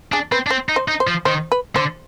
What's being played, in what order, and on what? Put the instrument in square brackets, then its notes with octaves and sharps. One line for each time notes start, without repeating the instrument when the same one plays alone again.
[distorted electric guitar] D4 [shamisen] G#4
[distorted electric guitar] C4 [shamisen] B4
[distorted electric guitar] D4
[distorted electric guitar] C4 [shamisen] C5
[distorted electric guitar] D#4
[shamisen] C5
[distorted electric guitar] D#4
[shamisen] C5
[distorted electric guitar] F3
[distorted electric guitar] D#3 [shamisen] C5
[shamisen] B4
[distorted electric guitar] D3 [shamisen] C5